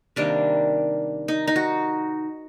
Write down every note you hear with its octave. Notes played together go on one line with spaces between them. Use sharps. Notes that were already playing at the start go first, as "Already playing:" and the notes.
C3 D#3 G3 A#3 D4
D#4
D#4
F#4